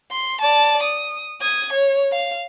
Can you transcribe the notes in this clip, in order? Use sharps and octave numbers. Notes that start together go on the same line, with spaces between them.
C6
D5 A5
D#6
D#6 G#6
C#5
F5